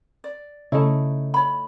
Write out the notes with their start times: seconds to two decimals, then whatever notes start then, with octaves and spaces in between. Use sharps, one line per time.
0.24 D5
0.72 C#3 A3 D#4 E4
1.34 C#5 B5